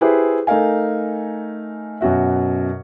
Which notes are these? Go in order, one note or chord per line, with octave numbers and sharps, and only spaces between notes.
E4 G4 G#4 B4 C5 E5
A3 D#4 A#4 F5 G#5
F#2 B2 F#4 E5